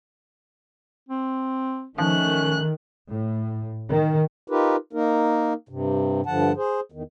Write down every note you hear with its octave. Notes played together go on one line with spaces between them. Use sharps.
C4
D#3 F3 A3 C#4 F#6
A2
D#3
D#4 F4 G4 A#4 B4
A#3 D#4 A#4
G2 C3
G2 D3 F3 F#5 A5
G#4 C5
E2 D#3